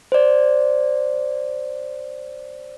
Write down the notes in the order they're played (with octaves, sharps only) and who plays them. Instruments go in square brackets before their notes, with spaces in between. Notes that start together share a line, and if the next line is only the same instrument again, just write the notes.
[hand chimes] C5 D5